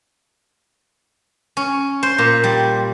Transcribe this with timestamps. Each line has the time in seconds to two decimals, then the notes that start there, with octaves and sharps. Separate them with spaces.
1.57 C#4
2.03 C5
2.18 A#2
2.44 G3